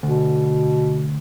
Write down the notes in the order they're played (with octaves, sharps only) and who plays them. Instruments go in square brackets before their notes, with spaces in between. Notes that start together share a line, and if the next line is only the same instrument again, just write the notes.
[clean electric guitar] D2 [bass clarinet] B2